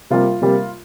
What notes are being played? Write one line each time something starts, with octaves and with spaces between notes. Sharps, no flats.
C3 G3 A#3 F4
C3 G3 A#3